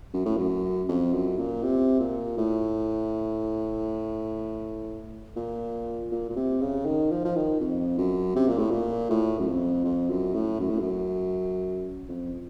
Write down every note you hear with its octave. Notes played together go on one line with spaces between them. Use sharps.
F#2
A2
F#2
F2
F#2
A#2
C3
A#2
A2
A#2
A#2
A#2
C3
C#3
D#3
F3
F3
D#3
F2
F#2
C3
A#2
A2
A#2
A2
F#2
F2
F2
F#2
A2
F#2
A2
F#2
F2